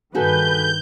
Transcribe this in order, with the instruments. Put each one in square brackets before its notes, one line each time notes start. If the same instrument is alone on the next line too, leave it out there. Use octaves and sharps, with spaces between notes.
[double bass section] G2 D#3 [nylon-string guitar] F#4 G#4 A4 [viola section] B4 [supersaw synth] G6